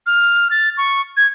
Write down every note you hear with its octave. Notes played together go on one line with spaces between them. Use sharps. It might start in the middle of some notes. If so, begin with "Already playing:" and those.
F6
A6
C#6
G#6